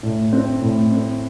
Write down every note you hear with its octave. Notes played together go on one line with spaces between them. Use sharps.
A2
C4
A2
C4